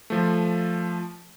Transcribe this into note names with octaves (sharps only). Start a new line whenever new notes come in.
F3 A3